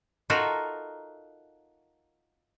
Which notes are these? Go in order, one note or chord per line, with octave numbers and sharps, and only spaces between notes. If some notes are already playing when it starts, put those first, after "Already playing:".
D#4 F4 F#4 A4 A#4 E5